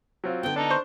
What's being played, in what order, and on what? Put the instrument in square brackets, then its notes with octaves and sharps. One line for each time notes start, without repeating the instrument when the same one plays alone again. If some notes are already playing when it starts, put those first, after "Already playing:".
[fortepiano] F#3 C4 F4
[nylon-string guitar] D3 B3 [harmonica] G5
[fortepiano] D4 [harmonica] D#4 A4
[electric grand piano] C5 C#6 G6